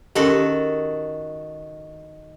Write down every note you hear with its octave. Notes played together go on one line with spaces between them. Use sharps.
D#3 C#4 F#4 G4 A4